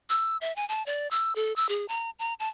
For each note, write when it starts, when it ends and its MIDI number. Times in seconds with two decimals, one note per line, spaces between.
0.10 0.37 88
0.41 0.54 76
0.56 0.67 80
0.69 0.85 81
0.86 1.10 74
1.11 1.35 88
1.36 1.55 69
1.56 1.69 88
1.69 1.86 68
1.88 2.10 82
2.19 2.34 82
2.40 2.49 81